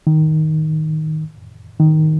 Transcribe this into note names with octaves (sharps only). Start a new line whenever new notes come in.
D#3
D#3